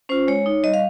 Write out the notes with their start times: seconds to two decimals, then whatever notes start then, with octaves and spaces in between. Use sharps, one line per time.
0.09 C#4 F4 C5
0.28 G#3 C#5
0.46 D#4
0.63 G3 D#5
0.74 F5